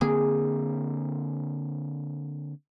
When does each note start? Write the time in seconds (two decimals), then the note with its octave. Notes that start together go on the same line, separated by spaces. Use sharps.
0.01 D3 A#3 C4 G#4